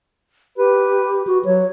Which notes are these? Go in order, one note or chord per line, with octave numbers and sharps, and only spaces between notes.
G4 B4
F#4
F#3 C#5